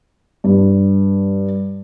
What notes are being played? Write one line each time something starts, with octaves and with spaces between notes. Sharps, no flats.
G2